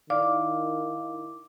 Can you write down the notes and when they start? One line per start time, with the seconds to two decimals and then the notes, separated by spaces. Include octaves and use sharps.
0.10 D#3 E4 D5 F5 D6